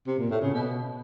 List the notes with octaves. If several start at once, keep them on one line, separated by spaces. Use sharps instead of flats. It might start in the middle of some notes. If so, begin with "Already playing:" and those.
C3
A#2
A2
C#3
B2